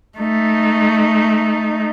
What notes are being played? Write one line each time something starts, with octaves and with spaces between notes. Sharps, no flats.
A3 D#4